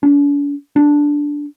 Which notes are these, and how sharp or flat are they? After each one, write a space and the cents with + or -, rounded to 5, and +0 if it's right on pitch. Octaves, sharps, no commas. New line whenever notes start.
D4 -45
D4 -5